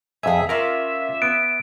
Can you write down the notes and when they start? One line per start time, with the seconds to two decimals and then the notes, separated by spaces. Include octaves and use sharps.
0.23 F2 G#4 E5 G#5
0.49 C#4 F4 A#4 D5 E5
1.22 B3 D7